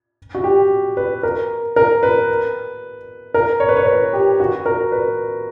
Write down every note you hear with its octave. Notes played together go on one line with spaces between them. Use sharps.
F#4
G4
B4
A#4
A#4
B4
A#4
C#5
B4
C#5
B4
G4
F#4
A#4
B4